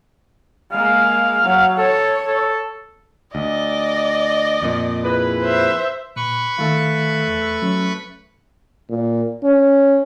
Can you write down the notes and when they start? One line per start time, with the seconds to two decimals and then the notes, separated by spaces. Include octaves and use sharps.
0.72 G#3 A#3 F5
1.44 F#3
1.78 A4 C#5
2.27 A4
3.35 D2 D5 D#5
4.62 F2 A#2
5.04 E4 G#4 B4
5.42 C5 E5
6.16 A#2 B4 B5 C#6
6.58 D#3 A3 F5
7.27 E2
7.62 F#3 C#4
8.89 A#2
9.44 C#4